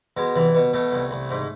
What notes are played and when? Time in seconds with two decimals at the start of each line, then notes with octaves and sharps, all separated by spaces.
0.17 B2 G#3
0.35 C2 E3
0.55 B2
0.73 B2 A3
0.92 C2
1.11 C2
1.30 G#2